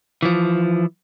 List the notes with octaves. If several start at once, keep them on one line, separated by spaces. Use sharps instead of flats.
E3 F3